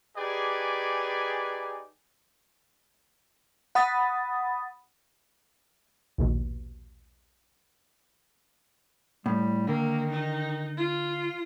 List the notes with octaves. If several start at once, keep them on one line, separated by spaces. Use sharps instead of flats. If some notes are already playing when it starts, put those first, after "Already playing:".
D#4 G4 G#4 B4 D5 G#5
F#5 B5 D#6 A6
A#1 D#2 B2
A2 G3
D3 D#3 A#3
D#4
F4